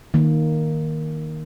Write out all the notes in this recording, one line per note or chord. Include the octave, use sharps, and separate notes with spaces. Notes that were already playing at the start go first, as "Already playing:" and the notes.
D#3 A#3